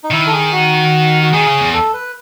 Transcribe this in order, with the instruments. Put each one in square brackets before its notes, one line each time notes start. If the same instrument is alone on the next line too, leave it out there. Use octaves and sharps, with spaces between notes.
[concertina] D#4
[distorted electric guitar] D#3 [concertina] E4
[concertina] A4
G#4
F#4
F#4
[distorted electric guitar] D#3 [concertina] G#4
[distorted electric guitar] C#3
E2
[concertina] A4
B4